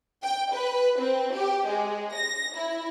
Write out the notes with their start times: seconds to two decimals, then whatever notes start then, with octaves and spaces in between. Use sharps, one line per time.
0.22 G5
0.52 B4
0.99 C4
1.34 G4
1.67 G#3
2.14 A#6
2.55 E4